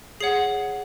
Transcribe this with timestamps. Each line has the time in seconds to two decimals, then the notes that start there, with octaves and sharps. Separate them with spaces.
0.20 G#4 C#5 F#5 C7